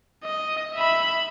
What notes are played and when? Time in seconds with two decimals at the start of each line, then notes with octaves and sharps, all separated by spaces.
0.24 D#5
0.74 E5 B5